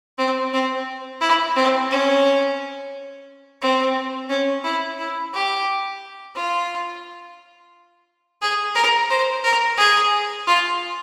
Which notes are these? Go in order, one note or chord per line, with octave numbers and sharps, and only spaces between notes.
C4
C4
E4
C4
C#4
C4
C#4
E4
E4
G4
F4
G#4
A#4
C5
A#4
G#4
F4